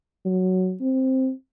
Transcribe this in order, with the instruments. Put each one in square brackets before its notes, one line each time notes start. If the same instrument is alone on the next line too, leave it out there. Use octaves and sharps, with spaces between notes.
[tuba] F#3
C4